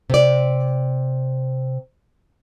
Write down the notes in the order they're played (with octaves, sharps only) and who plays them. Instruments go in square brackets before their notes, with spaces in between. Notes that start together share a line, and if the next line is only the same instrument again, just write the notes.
[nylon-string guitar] C3 D5